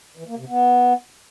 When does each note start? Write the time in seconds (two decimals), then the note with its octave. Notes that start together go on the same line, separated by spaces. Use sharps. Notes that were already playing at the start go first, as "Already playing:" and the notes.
0.17 E3
0.28 A#3
0.38 C3
0.48 B3